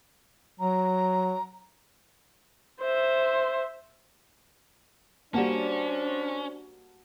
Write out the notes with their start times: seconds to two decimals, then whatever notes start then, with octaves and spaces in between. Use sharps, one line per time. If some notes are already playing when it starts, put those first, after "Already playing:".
0.60 F#3 A#5
2.80 C5 E5
5.34 G3 A#3 C#4 D4 F#4 C5 F#5 A5